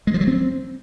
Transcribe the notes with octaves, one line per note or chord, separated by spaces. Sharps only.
G#3
F3
F#3
C4